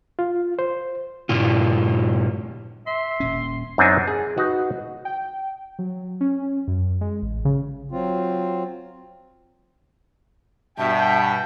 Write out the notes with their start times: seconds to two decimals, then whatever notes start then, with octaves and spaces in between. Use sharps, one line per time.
0.19 F4
0.59 C5
1.29 G2 A#2 F4
2.87 E5 C6
3.20 D#1 A#2 C#4
3.78 F#2 C4 D4 D#4 G#5
4.08 G#4
4.38 D#4 F#4 B4
5.05 G5
5.79 F#3
6.21 C#4
6.68 F#2
7.01 G#3
7.22 A1
7.45 C#3
7.92 F#3 C4 F4
10.78 G2 B2 E5 G5 A5